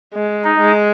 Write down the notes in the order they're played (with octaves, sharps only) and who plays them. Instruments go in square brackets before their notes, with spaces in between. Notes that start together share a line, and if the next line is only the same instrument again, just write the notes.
[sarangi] G#3
[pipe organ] D#4
[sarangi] G#3